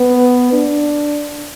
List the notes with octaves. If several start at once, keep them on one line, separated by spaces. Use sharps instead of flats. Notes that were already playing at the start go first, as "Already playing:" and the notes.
Already playing: B3
D4